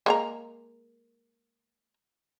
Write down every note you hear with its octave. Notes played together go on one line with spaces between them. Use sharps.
G#3 A#3 A#5